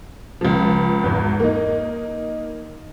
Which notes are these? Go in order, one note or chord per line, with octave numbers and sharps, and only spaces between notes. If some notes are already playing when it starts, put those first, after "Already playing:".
C#2 F3
G#1 E2
A#3 D#4